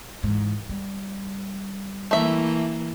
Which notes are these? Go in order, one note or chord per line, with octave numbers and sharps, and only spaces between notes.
G#2 E3
G3
E3 A3 A#3 E5